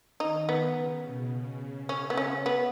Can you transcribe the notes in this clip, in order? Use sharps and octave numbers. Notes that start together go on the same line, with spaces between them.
D#3 D#4
B3
C#3
B2
C#3
C#4
B3
C#4
B3